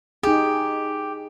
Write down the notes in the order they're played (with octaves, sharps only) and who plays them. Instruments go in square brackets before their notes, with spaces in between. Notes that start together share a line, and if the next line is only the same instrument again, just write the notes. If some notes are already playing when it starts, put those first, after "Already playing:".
[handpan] D#4 G#4 [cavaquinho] G4